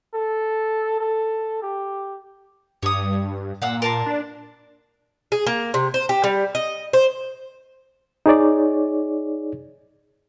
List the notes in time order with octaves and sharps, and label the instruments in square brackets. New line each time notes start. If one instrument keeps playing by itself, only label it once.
[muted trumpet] A4
A4
G4
[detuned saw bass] G2 [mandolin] C#5 D#6
[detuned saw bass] A#2 [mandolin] F5 F#5 E6
[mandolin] A#4 A5 C6
[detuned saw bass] D4
[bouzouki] G#4
A#3
C3
C5
G4
G3
D#5
C5
[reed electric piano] D#4 G#4 C#5 D5